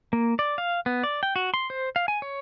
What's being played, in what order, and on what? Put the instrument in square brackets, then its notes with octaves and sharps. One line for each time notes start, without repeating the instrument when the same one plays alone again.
[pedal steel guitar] A#3
D5
F5
B3
D5
G5
F#4
C6
C5
F5
G#5
C#5